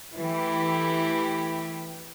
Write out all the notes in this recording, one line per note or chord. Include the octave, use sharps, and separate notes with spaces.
E3 A3 E4 G4